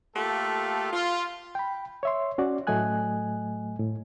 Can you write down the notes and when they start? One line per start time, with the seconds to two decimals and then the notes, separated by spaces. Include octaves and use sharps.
0.15 A3 A#3 F4 G4 A4
0.93 F4
1.55 G5 B5
2.03 C#5 E5 C6
2.38 C#4 F#4 D5
2.67 A2 F#3 A3 D#5 G#5 F#6
3.79 A2